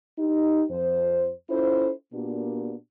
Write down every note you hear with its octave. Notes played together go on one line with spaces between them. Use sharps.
D#4 G4
F2 C5
C#4 E4 F4 A4 C5
A#2 A#3 B3 D4 F#4 G4